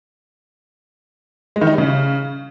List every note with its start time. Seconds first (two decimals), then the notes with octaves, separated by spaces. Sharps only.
1.56 G#3
1.61 D#3
1.67 D#4
1.73 G3
1.78 C#3